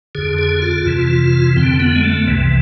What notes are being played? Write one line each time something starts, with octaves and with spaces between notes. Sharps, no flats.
F2 D3 G#4
G#4
F4
F2 C3 E3
F2 D3 C4
B3
G#3
A3
C2 C3 E3